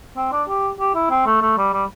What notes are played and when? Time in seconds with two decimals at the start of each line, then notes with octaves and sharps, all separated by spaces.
0.16 C4
0.32 D4
0.48 G4
0.79 G4
0.95 E4
1.10 C4
1.26 A3
1.42 A3
1.57 G3
1.73 G3